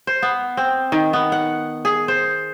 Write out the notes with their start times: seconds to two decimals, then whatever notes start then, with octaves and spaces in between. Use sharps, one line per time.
0.07 C5
0.22 B3
0.57 C4
0.92 D#3
1.13 B3
1.32 F#5
1.85 G#4
2.08 C5